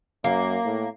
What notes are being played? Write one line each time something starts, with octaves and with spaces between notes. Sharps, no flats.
F#2 A#3
A2